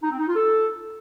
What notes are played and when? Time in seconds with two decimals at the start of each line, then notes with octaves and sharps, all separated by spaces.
0.03 D#4
0.11 C4
0.19 D#4
0.27 F4
0.35 A4